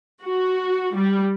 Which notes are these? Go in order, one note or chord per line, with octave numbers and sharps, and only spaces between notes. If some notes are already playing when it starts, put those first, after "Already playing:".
F#4
G3